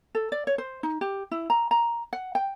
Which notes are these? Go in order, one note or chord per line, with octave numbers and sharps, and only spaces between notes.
A4
D5
C#5
C5
D#4
G4
E4
A#5
A#5
F#5
G5